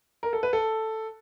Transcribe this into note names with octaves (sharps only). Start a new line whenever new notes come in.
A#4
A4
B4
A4